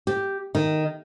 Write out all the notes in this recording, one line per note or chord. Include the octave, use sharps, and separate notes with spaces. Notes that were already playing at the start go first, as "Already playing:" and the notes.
G4
D#3